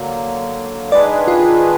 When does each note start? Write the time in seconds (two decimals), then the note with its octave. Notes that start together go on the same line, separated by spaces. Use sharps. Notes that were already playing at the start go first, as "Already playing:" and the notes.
Already playing: D3 F#3 A#3
0.91 D#3 G#3 D4 G#4 B4 D5
1.28 F4